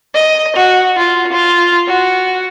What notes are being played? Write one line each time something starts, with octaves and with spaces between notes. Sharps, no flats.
D#5
F#4
F4
F4
F#4